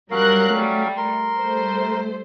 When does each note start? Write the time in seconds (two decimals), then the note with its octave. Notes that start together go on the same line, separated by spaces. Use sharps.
0.11 F#3 G3 C#4 A#4 F5 F#6
0.51 G3 A3
0.97 A#4 C6
1.39 G3 A3 C5